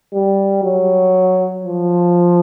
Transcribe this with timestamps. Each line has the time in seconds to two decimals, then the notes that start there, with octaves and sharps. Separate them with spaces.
0.14 G3
0.64 F#3
1.64 F3